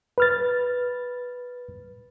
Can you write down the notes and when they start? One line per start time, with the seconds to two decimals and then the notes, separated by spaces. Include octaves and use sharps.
0.18 B4 F6 A6